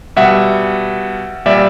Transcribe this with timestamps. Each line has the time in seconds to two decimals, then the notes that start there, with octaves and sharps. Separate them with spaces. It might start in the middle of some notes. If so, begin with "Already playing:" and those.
0.16 B2 G3 E5 F#5
1.45 A#2 G3 D5 E5